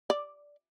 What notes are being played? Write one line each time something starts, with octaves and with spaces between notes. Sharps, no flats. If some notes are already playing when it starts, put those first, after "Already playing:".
D5